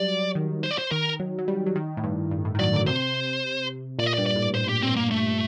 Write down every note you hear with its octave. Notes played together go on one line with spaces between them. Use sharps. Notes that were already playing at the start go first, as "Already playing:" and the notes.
Already playing: F#3 G3 D5
D#3
C5
D5
C5
D#3 A#4
F#3
F#3
G3
F#3
D#3
A2
G2
G2
A2
D#3
F#3 D5
D3
C3 C5
A#2 D5
D#5
D5
G2
D5
A2
A2 C5
G4
C4
A#3
A3